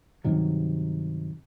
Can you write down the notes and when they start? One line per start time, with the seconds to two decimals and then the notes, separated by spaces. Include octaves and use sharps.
0.24 G2 C3 D#3 F#3